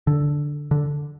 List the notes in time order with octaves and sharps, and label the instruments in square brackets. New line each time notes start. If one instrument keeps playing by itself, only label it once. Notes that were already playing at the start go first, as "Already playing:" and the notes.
[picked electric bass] D3
D3